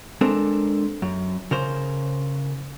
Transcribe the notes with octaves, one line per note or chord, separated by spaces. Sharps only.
G#3 C4 D4 A4 A#4
F#2
C#3 A#4 C5